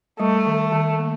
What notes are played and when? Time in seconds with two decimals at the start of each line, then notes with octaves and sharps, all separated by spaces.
0.20 G3 A3
0.46 D#3
0.72 D#3
0.99 A#3